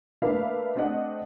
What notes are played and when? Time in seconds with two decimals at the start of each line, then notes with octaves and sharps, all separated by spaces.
0.22 A3 A#3 D4 B4 E5 F5
0.76 A3 C4 D4 D#5 F#5